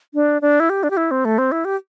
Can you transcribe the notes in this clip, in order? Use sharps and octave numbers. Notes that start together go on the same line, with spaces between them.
D4
D4
E4
G4
D4
G4
E4
C4
A3
C4
E4
G4